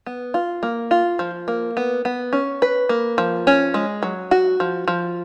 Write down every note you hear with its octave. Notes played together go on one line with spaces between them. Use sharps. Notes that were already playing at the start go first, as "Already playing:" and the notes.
B3
F4
A#3
F4
F3
A#3
B3
B3
C#4
B4
A#3
F3
C#4
G#3
F#3
F#4
F3
F3